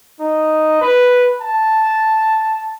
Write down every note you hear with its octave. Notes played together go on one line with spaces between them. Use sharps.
D#4
B4
A5